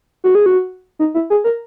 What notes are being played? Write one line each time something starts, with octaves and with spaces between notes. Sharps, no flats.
F#4
G#4
F#4
D#4
E4
G#4
A#4